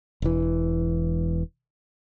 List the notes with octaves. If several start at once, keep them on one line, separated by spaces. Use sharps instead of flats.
E1 E3